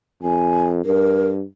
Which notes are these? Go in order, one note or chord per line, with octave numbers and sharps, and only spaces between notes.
F2 G#5
G2 A#4